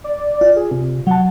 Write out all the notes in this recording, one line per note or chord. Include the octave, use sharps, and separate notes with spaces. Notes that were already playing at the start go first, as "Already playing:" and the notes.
D5
F4
G#4
C3
F#3 F#5 A5